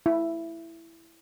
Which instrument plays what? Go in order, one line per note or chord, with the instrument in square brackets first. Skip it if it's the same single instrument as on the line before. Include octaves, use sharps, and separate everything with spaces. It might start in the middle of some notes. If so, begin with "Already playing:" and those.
[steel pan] E4